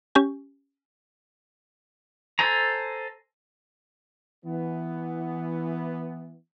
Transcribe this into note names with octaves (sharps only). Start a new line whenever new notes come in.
C#4 G4 G#5
A4 C5 G#5 A#5
E3 B3